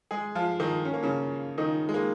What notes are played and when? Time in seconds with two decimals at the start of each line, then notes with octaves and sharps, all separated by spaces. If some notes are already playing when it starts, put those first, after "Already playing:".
0.11 G#3 G#4
0.35 F3 F4
0.60 D#3 D#4
0.85 C#4
0.93 A#3
1.03 C#3 C#4
1.58 D#3 D#4
1.89 G#3
1.94 A#3